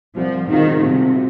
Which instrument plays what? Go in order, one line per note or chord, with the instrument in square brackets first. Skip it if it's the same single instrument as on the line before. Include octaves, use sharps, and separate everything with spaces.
[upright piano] C2 [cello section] F3
[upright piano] B2 G#3 C4 F4 [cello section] D#3
[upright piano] C2 [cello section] C3
[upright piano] B2